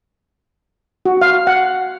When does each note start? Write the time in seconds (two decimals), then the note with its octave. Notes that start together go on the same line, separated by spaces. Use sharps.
1.05 F#4
1.21 F5
1.47 F#5